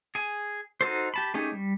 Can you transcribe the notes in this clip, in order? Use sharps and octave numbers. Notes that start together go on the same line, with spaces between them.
G#4 G#5
D#4 F#4 A4 C5
G4 A5 B5
A3 C#4 D#4 G4 G#4
G3